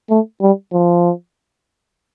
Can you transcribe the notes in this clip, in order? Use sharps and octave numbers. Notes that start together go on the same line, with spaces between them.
A3
G3
F3